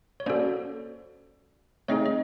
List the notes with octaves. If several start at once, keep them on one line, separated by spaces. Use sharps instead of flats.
C#5
A#3 C#4 F#4 A4 C5 D5
A3 C4 D#4 G#4 C#5 D#5
D#5